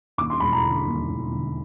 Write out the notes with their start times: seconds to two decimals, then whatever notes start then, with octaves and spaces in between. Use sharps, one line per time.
0.18 D#2 D6
0.30 C6
0.40 E1 B5
0.53 A#5
0.64 D3
0.86 D#2
1.09 E1
1.31 D3